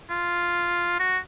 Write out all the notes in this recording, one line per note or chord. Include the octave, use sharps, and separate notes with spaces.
F4
F#4